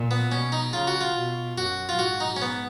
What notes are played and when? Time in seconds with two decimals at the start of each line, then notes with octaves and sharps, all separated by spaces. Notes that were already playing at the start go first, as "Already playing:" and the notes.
Already playing: A#2
0.11 B3
0.32 B2 C#4
0.52 D#4
0.73 C#3 F4
0.87 F#4
1.01 F4
1.16 B2
1.58 F#2 F#4
1.89 F4
1.99 G#2 F#4
2.20 D#4
2.36 C#4
2.42 B3